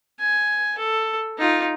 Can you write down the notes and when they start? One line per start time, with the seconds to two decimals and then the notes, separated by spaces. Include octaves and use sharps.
0.20 G#5
0.78 A4
1.38 D#4 F4